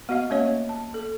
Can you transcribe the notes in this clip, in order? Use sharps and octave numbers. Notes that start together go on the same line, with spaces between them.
B3 F#4 D#5 F5
A3 A#3 C#4 F#4 C#5 D#5
A5
A4